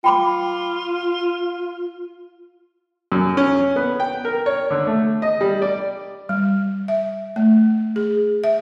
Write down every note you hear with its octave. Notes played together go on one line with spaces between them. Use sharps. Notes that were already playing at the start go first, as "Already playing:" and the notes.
F4 G5 B5 D6
F#2
C#4
B3
G5
A#4
C#5
D3
A3
D#5
G3
D5
G3
E5
A3
G#4
E5